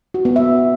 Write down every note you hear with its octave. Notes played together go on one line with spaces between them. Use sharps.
F#4
B3
E5